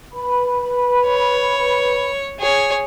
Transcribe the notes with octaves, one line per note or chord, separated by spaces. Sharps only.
B4 B5
C#5
G#4 C#5